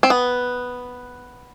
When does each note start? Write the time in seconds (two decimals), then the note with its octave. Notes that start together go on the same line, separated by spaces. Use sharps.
0.03 C4
0.10 B3